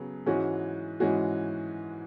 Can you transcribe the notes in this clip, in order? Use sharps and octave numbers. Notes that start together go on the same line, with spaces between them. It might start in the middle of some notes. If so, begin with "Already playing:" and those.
Already playing: C#3 F#3 B3 G#4
G#2 E3 G#3 C#4 F#4
G#2 E3 G#3 C#4 F#4